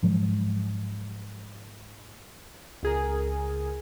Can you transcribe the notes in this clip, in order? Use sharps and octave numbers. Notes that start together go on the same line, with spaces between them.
G#2 F3 F#3 G#3
C#2 G#4 A#4